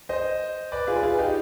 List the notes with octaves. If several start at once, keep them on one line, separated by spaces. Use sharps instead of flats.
C5 D#5
B4 D5
F4 G#4
B4
F4 G#4
D#4 G4